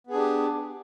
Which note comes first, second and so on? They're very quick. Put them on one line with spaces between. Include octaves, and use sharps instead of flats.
B3 G#4 D4 G4